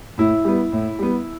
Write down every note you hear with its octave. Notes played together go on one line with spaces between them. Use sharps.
A2 E4
G3 B3
A2
G3 B3